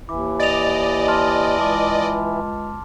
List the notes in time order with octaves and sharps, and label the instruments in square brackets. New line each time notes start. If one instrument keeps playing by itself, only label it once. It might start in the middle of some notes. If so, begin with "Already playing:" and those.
[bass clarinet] D#2 [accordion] E3 E4 [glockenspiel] D6
[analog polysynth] D5 D#5 [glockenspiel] A6 F7
[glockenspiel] A5 C6 F6
[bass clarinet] C#2 [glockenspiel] A5 D6